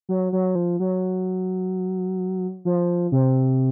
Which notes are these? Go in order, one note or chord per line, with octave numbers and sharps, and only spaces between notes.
F#3
F#3
F3
F#3
F3
C3